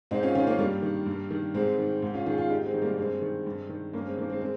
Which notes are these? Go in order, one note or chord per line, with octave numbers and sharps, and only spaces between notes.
G#2 C4 D#4
C#4 F4
D#3 C#4 F4
A#3 C#4
G2 G3 A#3
D#3
G2
D#3
G#2 G#3 C4
D#3
G#2
C#4 F4
D#3 F4 G#4
F4 G#4
G#2 D#4 G4
G#3 C4
D#3
G3 A#3
G2 G#3 C4
D#3
G2
D#3
G2 A#3 C#4
G#3 C4
D#3 A#3 C#4
G#3 C4
G#3 C4